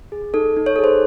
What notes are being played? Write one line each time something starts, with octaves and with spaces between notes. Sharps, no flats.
G#4
D#4 A4
D#4
C#5
G#4 A4
C5